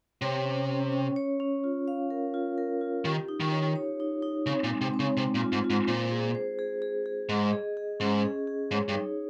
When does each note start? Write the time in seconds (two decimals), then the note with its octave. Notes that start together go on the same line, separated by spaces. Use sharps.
0.22 C3 C#5
0.45 C#4
0.69 C#4
0.92 C#4
1.16 C#5
1.40 C#4
1.64 F4
1.88 F5
2.10 A#4
2.34 F4
2.58 A#4
2.81 F4
3.05 D#3 G4
3.28 D#4
3.40 D#3
3.52 C#5
3.76 C#5
4.00 D#4
4.22 D#4
4.46 C#3 C4
4.64 A#2
4.70 G#3
4.81 C3
4.94 C4
5.00 C#3
5.17 C3 G#3
5.35 A#2
5.41 F4
5.52 G#2
5.64 F4
5.70 G#2
5.88 A#2 C5
6.11 G#4
6.35 C5
6.59 G#4
6.82 G#4
7.06 G#4
7.29 G#2 D#5
7.53 G#4
7.77 G#4
8.00 G#2 C#4
8.24 G#4
8.47 G#4
8.71 G#2 C#5
8.89 G2
8.94 D#4